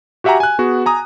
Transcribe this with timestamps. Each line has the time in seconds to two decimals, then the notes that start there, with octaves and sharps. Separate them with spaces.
0.24 F#4 G4 E5 F#5 G#5 A#5
0.40 G#5 F#6
0.59 B3 F#4 G#4
0.86 G#5 A#5 D#6